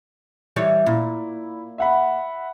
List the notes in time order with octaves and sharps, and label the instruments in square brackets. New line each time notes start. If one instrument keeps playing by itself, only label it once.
[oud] E3 G3 C#5
[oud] A#2 [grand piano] E4
[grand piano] E5 F#5 B5